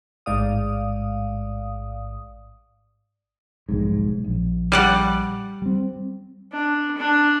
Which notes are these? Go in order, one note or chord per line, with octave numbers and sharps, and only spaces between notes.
A1 G#2 D5 F5 D#6
F1 B1 G#2
A#1
G3 D5 F#5
G3 C4
D4
D4